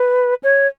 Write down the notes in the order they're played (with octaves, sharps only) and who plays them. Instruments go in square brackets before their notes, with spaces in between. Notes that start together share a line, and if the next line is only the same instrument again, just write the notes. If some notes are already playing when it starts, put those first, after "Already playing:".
Already playing: [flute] B4
C#5